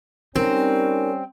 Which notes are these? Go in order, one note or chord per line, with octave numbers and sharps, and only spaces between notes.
G3 C4 C#4 D#4 A#4